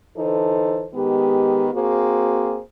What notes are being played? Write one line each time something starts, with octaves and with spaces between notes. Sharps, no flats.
D3 E3 D#4 A4 C5
D#3 G#3 B3 G4
A#3 C4 F#4 G#4 C5